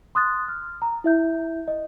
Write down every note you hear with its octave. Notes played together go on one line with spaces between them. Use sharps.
C6 D#6 F#6 A6
F6
A#5
E4 E5 G6
D#5